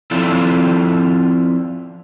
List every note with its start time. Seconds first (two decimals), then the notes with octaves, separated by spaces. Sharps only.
0.11 F3 C4 E4 F4 A4 D5